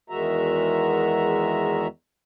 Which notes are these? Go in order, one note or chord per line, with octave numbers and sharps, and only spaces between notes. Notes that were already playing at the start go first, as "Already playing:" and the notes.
E2 D#3 G#3 F#4 E5 A#5